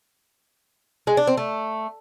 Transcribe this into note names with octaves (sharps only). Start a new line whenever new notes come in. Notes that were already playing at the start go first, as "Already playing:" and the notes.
G#3
D4
C4
A3